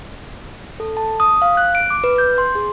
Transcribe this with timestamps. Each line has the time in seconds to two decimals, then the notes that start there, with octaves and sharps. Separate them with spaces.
0.80 A4
0.97 A5
1.20 D#6
1.42 F5
1.57 F#6
1.75 D7
1.90 D6
2.04 B4
2.18 G6
2.38 C6
2.55 G#4